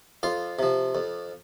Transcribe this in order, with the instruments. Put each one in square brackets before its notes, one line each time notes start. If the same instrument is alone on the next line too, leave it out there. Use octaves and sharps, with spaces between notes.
[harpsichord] F2 F4 F5
C3 F3
F2